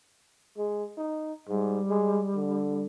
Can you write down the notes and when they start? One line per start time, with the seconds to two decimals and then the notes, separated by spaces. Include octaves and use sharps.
0.58 G#3
0.98 D#4
1.49 G#2 G3
1.90 G#3
2.35 D3